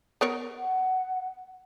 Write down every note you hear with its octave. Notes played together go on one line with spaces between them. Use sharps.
B3 A#4 C#5
F#5